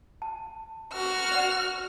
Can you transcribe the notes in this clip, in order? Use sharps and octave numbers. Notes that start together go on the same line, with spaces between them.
A5
F#4 F6
D5 F#5